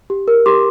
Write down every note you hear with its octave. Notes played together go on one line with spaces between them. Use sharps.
G4
A#4
G4 C6 D6